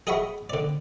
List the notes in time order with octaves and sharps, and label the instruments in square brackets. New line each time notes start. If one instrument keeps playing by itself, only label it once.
[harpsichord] G#4 D#5 E5 F#5 B5 C#6
D3 D5